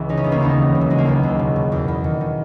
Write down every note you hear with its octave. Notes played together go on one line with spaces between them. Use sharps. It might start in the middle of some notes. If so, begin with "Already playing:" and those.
Already playing: C#2 E3
C#3 D#4
C#4
C#2 B3
A#3 C#4
D#2 B3 D#4
E3
C#3
F#3
D#2 G#3
A#3
C#2 G#3 B3
C#2
B2
B2
E2
E2
D#3
D#3